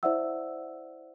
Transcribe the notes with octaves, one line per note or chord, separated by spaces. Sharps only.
E4 C5 D5 E5 F#5 E6